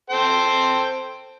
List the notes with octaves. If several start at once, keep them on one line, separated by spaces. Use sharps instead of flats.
A4 C5 G5